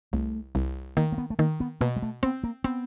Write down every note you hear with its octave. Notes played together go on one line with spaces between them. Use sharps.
C2 A3
C2
D#3 A#3
A#3
B3
A3
D#3 A#3
B3
B2 A#3
G#3
A3
B3 C4
A#3
B3 C4